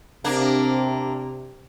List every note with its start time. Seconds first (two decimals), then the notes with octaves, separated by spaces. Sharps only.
0.24 C3 A#3 D4